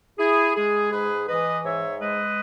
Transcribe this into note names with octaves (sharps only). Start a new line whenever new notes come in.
E4 G#4
G#3 G#4
G#2 G#4 B4
E3 B4 D#5
G#2 C#5 E5
G#3 B4 D#5